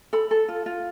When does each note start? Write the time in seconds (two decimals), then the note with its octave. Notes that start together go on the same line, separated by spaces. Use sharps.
0.13 A4 B5
0.31 A4
0.48 F4
0.66 F4